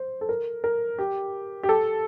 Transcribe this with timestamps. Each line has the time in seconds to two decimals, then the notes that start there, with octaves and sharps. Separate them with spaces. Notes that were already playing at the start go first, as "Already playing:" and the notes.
Already playing: C5
0.21 A4
0.29 A#4
0.64 A#4
0.98 G4
1.63 G4
1.69 A4